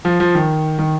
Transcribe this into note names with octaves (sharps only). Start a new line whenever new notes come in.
F3
F3
D#3
D#3